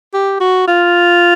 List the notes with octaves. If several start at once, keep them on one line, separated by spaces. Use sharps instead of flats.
G4
F#4
F4